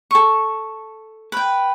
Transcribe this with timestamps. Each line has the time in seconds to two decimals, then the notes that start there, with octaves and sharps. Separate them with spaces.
0.11 A4 C#6
1.32 B4 G5